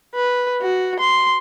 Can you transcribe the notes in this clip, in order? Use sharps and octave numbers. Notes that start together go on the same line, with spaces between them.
B4
F#4
C6